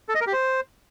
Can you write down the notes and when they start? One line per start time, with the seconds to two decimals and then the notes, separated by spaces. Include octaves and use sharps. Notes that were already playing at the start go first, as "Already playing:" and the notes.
0.09 A4
0.15 D#5
0.21 A#4
0.27 G4
0.33 C5